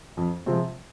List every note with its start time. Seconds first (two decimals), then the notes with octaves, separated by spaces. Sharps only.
0.17 F2
0.46 C3 F3 G#3 C4